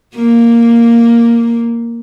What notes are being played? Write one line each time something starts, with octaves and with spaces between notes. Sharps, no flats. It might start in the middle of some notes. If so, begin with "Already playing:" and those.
A#3